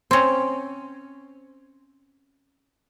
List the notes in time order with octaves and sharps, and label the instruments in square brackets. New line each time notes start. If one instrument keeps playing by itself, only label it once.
[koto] C4 C#4